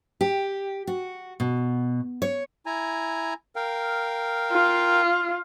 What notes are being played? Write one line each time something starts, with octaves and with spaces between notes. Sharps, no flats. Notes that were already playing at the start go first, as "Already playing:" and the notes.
G4
F#4
B2
C#5
E4 G#5 A#5
A#4 F5 G5
F4